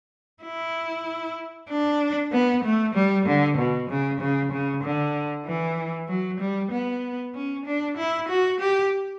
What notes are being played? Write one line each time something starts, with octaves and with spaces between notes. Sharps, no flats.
E4
D4
B3
A3
G3
D3
B2
C#3
C#3
C#3
D3
E3
F#3
G3
B3
C#4
D4
E4
F#4
G4